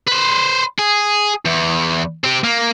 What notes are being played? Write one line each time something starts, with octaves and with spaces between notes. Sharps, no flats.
B4 C5
G#4
E2
C4 G4
A#3